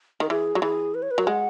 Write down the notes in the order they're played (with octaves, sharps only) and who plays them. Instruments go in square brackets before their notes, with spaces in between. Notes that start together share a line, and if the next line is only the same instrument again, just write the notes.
[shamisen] D#3 [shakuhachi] A#4
[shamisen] E3 [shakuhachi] G#4
[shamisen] F#3
[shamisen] E3 [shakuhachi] G#4
[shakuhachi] B4
C#5
B4
[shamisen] F#3 [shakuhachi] A#4
[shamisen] G#3 [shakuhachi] F#5